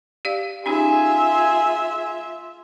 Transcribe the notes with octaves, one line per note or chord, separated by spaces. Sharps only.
G4 D5 F5
C#4 D#4 F4 G4 G#4 E5 G#5